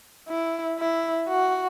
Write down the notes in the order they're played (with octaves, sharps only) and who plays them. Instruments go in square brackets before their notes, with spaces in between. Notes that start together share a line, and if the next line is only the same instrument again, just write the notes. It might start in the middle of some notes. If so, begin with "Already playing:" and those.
[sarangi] E4
E4
F#4